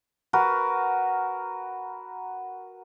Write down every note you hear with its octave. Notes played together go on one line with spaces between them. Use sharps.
F#4 A#4 B4